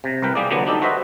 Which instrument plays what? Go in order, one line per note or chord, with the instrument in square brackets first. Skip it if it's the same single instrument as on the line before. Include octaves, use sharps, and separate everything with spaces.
[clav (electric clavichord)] C3
C2 A#4 B4 G5
G3 A#3 G#4 D5
D3 F3 F#3 B3
D4 D#4 G4 A4
F#4 B4 C5 D#5 E5